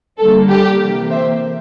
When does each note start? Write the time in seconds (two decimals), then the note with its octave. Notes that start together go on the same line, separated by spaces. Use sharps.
0.18 D3 G3 A#3 A4
0.49 G4
0.80 C3 E3 A#3
1.11 C5 E5